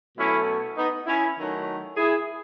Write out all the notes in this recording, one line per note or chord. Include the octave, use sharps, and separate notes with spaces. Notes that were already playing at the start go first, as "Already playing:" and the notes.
B2 F#3 A3 C#4 E4
B3 D#4
C#4 E4
D#3 F#3 A3
E4 G#4